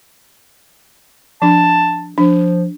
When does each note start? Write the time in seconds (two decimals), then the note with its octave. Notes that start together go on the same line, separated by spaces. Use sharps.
1.42 F3 D4 A5
2.18 F3 D4